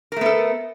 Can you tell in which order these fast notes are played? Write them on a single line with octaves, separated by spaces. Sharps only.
A#4 A3 B3 A4